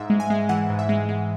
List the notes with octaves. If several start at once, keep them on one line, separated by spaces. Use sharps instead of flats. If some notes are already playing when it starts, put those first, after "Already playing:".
Already playing: G#2 E5
G#3
G#5
G#3
E3 F#5
G#2
E5
G#3
G#3